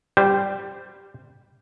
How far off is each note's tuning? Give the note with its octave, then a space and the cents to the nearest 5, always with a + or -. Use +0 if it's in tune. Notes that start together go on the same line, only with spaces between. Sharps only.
G3 +0 G4 +10 C5 -15